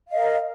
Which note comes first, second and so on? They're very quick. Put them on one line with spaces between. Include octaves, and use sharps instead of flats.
F5 D#5 A#4